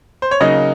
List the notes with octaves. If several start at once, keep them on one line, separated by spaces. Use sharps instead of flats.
C5
C#5
C#3 F#3 A#3 D#4 D#5